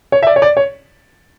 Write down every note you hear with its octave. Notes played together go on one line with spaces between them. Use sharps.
C#5
E5
D5
C#5
D5
C#5